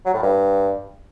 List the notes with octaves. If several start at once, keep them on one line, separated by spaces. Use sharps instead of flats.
F#3
A2
G2